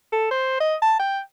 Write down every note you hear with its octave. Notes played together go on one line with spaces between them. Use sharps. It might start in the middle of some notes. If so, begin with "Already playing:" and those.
A4
C5
D#5
A5
G5